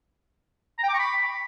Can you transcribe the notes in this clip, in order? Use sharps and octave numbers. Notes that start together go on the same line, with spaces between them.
A#5
G5
D6
C#6
B5